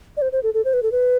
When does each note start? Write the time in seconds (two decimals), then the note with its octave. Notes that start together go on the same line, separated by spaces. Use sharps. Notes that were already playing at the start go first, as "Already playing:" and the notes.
0.17 D5
0.22 C5
0.32 C5
0.43 A4
0.54 A4
0.65 C5
0.74 B4
0.83 A4
0.92 B4